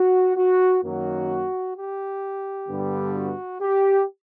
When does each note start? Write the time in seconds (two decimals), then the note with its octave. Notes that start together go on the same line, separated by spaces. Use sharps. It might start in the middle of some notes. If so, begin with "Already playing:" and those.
Already playing: F#4
0.36 F#4
0.83 F#2 D#3 F#3 A#3 F#4
1.75 G4
2.68 G2 D3 G3 B3
3.14 F#4
3.61 G4